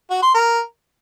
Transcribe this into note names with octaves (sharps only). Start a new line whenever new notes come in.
F#4
C6
A#4